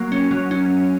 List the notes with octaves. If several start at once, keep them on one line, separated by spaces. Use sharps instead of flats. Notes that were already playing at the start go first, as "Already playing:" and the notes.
Already playing: F#3 A#3
C#4
F#3
C#4